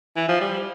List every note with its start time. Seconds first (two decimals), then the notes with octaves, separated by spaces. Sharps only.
0.16 E3
0.28 F3
0.41 G3